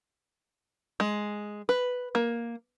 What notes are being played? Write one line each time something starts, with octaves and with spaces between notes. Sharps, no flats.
G#3
B4
A#3